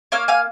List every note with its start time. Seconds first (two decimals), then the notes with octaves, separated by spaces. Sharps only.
0.12 A#3 C#5 F5
0.28 F5 G#5